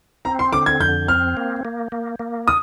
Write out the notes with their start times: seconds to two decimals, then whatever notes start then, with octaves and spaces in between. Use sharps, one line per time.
0.25 C4 A#5
0.39 C6
0.53 D3 D6
0.66 G#6
0.80 F2 G6
1.08 C4 F6
1.37 A#3
1.65 A#3
1.92 A#3
2.19 A#3
2.48 D#6